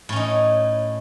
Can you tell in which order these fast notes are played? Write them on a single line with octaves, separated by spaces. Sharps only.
A2 C#4 D#4